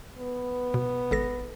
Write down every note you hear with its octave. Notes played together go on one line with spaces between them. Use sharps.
B3
B2
G#1 A4 A#6